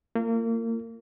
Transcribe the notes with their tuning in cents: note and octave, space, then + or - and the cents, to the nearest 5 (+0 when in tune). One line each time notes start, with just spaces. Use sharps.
A#3 -30 F4 -30